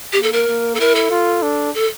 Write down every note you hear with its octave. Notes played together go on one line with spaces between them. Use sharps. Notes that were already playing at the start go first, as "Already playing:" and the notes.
A#3 G4
A4
A#4
A#3
A4
E4 A#4
A4
F4
D4
A4